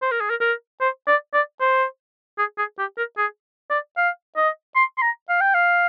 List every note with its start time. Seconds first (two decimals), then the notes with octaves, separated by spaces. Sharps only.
0.02 C5
0.11 A#4
0.21 G#4
0.30 A#4
0.41 A#4
0.81 C5
1.07 D5
1.33 D5
1.60 C5
2.38 G#4
2.58 G#4
2.79 G4
2.97 A#4
3.18 G#4
3.70 D5
3.97 F5
4.37 D#5
4.75 C6
4.98 C6
5.02 A#5
5.29 F5
5.41 G5
5.54 F5